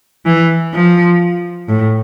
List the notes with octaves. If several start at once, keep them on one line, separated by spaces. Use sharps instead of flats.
E3
F3
A2